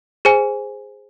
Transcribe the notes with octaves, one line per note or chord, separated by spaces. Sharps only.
G#4 C5 G#5